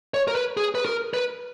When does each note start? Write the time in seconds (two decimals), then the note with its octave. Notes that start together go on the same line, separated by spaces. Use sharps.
0.14 C#5
0.28 A#4
0.35 B4
0.57 G#4
0.75 B4
0.85 A#4
1.14 B4